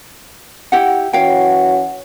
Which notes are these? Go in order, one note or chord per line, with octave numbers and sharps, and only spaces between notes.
E4 G4 F#5
E3 C#4 F#4 C#5 F5 G5